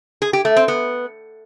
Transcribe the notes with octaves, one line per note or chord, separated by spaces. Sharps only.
G#4
G4
A3
C4
B3